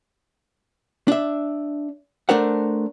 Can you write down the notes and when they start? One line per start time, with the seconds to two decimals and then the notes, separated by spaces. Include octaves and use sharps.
1.08 D4 E5
2.29 A3 D4 A#4 C5 F#5